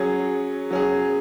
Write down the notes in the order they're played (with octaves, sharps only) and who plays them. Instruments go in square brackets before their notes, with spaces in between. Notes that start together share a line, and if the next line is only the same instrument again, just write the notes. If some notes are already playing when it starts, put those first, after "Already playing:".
Already playing: [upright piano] F#3 C#4 G#4
F#3 C#4 G#4